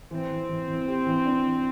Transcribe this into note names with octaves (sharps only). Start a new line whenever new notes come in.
E3 C4
E3
E3
E3
G4
E3
D4
E3